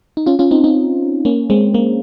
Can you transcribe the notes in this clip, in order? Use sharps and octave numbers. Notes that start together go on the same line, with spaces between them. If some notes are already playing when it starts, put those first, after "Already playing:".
D#4
C#4 F4
C#4 F4
C4 D#4
C4 D#4
A#3 C#4
G#3 C4
A#3